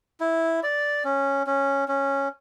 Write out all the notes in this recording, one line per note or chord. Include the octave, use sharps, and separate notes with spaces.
E4
D5
C#4
C#4
C#4